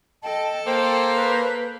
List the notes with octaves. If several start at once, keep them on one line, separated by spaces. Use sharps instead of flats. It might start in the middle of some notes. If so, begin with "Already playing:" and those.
A4 D#5 G5 A5
A#3 C5 G5
B4